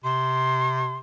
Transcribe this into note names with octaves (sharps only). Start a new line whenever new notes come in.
C3 C6